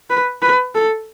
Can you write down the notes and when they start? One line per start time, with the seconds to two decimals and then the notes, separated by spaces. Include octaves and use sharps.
0.10 B4
0.42 B4
0.75 A4